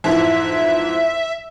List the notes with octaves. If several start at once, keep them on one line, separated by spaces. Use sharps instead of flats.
F2 G#2 E3 E5